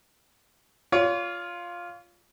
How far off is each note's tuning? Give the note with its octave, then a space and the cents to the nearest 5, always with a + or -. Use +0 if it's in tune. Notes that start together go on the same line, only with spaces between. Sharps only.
F4 +0 C#5 +45